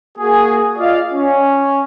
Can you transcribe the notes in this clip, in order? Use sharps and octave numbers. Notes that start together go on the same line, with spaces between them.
A#3 F#4 G#4
F4 D5 D#5 F5
C#4